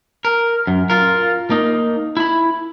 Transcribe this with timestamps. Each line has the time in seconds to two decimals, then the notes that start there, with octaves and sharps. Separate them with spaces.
0.25 A#4
0.67 F#2
0.90 F4 A#4
1.51 A#3 D#4
2.17 E4 B5